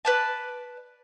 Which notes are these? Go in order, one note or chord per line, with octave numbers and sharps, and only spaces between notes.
B4 D5 A5